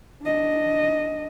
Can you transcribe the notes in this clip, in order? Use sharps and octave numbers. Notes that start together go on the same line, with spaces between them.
D4 D#5